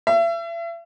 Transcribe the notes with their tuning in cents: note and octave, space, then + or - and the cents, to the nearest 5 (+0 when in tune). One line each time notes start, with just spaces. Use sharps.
E5 +40